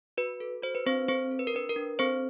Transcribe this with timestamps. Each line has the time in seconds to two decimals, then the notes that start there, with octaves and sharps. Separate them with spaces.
0.17 F#4 B4
0.40 A4
0.62 F#4 C5
0.75 B4
0.86 C4 D4 C5
1.08 C4 A4 C5
1.31 A4
1.39 B4
1.47 A#4
1.54 D4 B4
1.69 A#4
1.76 D4
1.99 C4 A4 C5